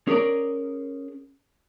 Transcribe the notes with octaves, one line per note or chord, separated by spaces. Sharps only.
C#4 G#4 A#4 D5